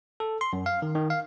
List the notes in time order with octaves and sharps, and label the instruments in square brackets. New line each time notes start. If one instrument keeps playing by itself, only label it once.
[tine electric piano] A4
C6
F#2
F5
D#3
D#3
F5